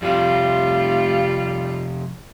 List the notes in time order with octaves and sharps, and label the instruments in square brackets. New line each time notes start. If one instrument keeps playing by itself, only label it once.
[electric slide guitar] F2 C3 [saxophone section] G3 F4